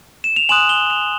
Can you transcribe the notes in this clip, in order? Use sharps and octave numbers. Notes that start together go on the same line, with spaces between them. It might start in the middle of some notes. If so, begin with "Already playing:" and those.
E7
F7
G#5 C6 D#6 F#6 E7 F#7
F7 G7
F7 G7